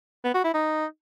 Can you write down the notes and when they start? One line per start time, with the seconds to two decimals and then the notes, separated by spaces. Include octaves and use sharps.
0.24 B3
0.34 F#4
0.44 E4
0.54 D#4